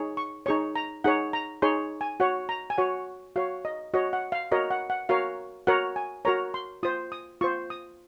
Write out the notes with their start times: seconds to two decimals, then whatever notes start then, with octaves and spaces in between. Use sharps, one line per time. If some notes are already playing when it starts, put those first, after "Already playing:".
Already playing: D#4 G#4 C#5
0.17 C#6
0.46 D#4 G#4 C#5 C#6
0.75 A#5
1.04 D#4 G#4 C#5 F#5
1.33 A#5
1.62 D#4 G#4 C#5 C6
2.01 G#5
2.20 F#4 C#5 F#5
2.49 A#5
2.70 G#5
2.78 F#4 C#5 F#5
3.36 F#4 C#5 F5
3.65 D#5
3.94 F#4 C#5 D#5
4.13 F#5
4.32 F5
4.52 F#4 A#4 C#5 D#5
4.71 F#5
4.90 F#5
5.09 F#4 A#4 C#5 F5
5.67 F#4 A#4 C#5 F#5
5.96 G#5
6.25 F#4 A#4 C#5 A#5
6.54 C6
6.83 F4 C5 D#6
7.12 D#6
7.41 F4 C5 C#6
7.70 D#6